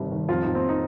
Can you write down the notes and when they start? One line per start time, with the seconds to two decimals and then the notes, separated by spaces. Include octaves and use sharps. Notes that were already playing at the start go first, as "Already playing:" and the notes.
Already playing: G1 C3 D#3 G3
0.12 D#3
0.28 F2 F4
0.42 F2 D#4
0.55 C4
0.69 D#4